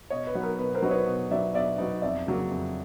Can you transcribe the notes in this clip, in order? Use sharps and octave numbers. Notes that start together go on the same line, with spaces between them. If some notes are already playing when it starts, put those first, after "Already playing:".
B2 C#5 D#5
B4
F#3 B3 D#4
A#4
B2 B4
A#4 C5
F#3 B3 D#4
B4 C#5
B2
F#3 B3 D#4 D5 E5
B2 D5 E5
F#3 B3 D#4
F2 D5 E5
C#3 F#3 A#3
F2